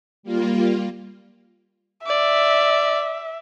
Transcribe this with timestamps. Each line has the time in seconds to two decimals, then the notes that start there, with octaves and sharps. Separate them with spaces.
0.23 G3 A#3 F4
2.07 D5 E5